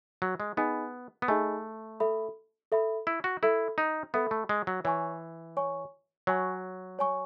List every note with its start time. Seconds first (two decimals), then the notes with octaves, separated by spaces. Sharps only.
0.22 F#3
0.40 G#3
0.57 B3 D#4 G#4 D#5 G#5 B5
1.22 B3
1.28 A3 D#4 G#4 D#5 G#5 B5
2.00 A4 E5 B5
2.72 A4 E5 B5
3.07 E4
3.24 F#4
3.43 E4 A4 E5 B5
3.78 D#4
4.14 B3 A4 E5 B5
4.31 A3
4.49 G#3
4.67 F#3
4.84 E3 C#5 G#5 C#6
5.57 C#5 G#5 C#6
6.27 F#3 C#5 G#5 C#6
6.99 C#5 G#5 C#6